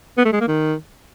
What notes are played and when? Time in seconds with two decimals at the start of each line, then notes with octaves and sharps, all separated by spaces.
0.18 B3
0.25 A3
0.33 G#3
0.40 A#3
0.48 D#3